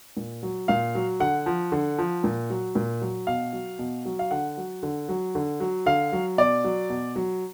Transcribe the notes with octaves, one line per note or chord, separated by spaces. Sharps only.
A#2
F#3
A#2 F5
F#3
D3 F#5
F3
D3
F3
A#2
F#3
A#2
F#3
B2 F5
F#3
B2
F#3
F5
D3 F#5
F#3
D3
F#3
D3
F#3
D3 F5
F#3
B2 D5
F#3
B2
F#3